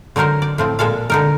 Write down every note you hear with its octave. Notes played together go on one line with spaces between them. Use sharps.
D3 F#3 D#4 A#4 C5
D5
A2 F3 C4
A#2 G#3 A4 F5
D3 D#4 A#4